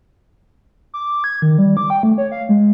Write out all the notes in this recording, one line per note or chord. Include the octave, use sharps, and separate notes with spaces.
D6
G#6
D#3
G3
D6
G5
A3
C#5
F5
G#3